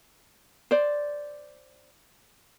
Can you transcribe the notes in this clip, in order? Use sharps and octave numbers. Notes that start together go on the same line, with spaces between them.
C5 D5